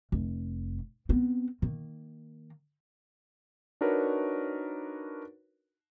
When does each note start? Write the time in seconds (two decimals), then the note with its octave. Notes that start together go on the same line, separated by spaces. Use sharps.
0.12 F1
1.09 B3 C4
1.62 D#3 A#3
3.81 D4 D#4 F#4 A#4 B4 C#5